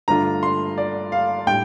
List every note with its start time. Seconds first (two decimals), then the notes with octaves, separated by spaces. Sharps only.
0.08 G2 D3 A3 D4 F4 A#5
0.43 C6
0.78 D5
1.12 F5
1.47 A2 G3 D4 G5